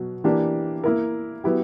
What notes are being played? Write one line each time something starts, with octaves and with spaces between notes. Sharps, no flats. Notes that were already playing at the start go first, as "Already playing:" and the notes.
Already playing: B2 F#3
E3 A#3 D4 G4
A#3 E4 A#4
F#3 B3 E4 G4